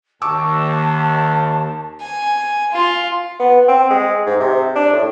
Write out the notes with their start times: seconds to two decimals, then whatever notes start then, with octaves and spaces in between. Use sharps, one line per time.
0.22 D#2 A5 C#6 D6 E6
2.01 G#5
2.72 F4
3.40 B3
3.68 C4
3.91 G#3
4.27 G#2
4.40 C3
4.76 D4
4.93 A2